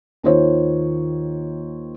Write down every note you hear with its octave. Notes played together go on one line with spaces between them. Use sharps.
D#2 D#3 F4 C5 C#5